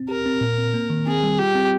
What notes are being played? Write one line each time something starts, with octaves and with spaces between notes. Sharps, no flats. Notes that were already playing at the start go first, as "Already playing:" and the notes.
Already playing: C4
G4 A#4
C4
A#2
C4
A#3
D#3
C4 G#4
G3
F4 G4
C4